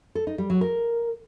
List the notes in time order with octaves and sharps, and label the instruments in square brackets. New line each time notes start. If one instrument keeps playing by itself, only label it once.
[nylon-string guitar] A4
D#4
G3
F#3
A#4